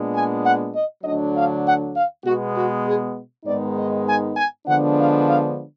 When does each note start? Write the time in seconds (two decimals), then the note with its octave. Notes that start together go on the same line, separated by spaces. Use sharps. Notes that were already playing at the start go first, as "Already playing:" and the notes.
Already playing: A#2 G#3 B3 D4
0.13 G#5
0.43 F#5
0.73 D#5
1.04 D2 D3 F#3 D4 D#5
1.34 F5
1.64 F#5
1.94 F5
2.24 B2 G#3 B3 F#4
2.55 F#4
2.85 G#4
3.45 G#2 D#3 G#3 B3 D#4 D5
3.76 D#5
4.06 G#5
4.36 G#5
4.66 D3 F3 G#3 B3 D4 F#5
4.97 F5
5.27 F5